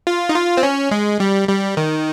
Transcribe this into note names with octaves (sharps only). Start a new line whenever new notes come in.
F4
D#4
F4
C4
C#4
G#3
G3
G3
D#3